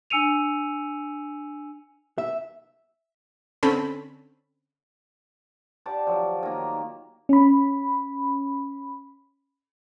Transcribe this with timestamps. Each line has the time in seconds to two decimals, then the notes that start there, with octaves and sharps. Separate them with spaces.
0.10 D4 G#5 E6 C#7 D#7 F7
2.18 E5
3.63 D3 C4 C#4 A4 B5
5.86 G4 D5 F#5 A5
6.07 F3 F#3
6.43 D#3 A#3
7.29 C#4 B5